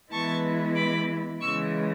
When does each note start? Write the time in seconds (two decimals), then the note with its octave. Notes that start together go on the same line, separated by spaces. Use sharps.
0.11 E3 G#3 B3 E4 A5 C#6
0.75 B5 D6
1.39 C#3 E3 G#3 C#6 E6